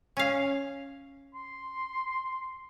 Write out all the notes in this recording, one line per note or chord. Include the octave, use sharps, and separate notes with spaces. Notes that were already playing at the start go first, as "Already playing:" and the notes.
C#4 F5
C6